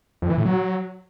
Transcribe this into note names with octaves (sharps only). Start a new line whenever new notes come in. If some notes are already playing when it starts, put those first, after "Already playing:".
F2
E3
A2
F#3